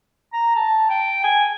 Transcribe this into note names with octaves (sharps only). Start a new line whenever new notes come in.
A#5
A5
G5
G#5